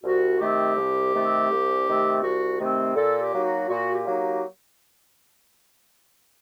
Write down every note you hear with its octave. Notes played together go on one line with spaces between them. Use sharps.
C2 F#4
C3 D#3 A3 C4 G4
C2
C3 D#3 A3 C4
C2
C3 D#3 A3 C4
C2 F#4
C3 D#3 A3 C4
A#2 A4
G4
F#3 A#3 D#4
F#4
A#2 F#4
G4
F#3 A#3 D#4
G4